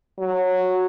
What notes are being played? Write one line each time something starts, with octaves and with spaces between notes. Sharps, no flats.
F#3